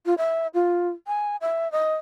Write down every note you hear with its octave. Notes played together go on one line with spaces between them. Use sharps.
F4
E5
F4
G#5
E5
D#5